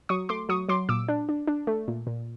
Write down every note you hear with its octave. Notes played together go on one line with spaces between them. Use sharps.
F#3 C#6 D#6
A3 C6 D6
F#3 C#6 D#6
F#3 C6 D6
A#2 D6 E6
D4
D4
D4
A3
A#2
A#2